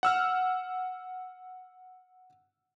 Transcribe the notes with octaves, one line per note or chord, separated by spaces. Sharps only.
F#5 E6 F6